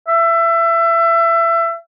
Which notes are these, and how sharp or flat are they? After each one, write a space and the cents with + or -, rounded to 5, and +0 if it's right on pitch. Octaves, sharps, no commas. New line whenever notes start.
E5 +25